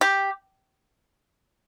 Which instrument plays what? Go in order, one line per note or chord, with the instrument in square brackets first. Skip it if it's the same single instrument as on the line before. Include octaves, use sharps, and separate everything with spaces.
[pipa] G4